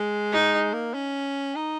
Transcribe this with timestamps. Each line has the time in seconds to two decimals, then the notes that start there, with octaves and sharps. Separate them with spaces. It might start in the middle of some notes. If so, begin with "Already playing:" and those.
Already playing: G#3
0.32 D#4
0.73 A#3
0.94 C#4
1.55 D#4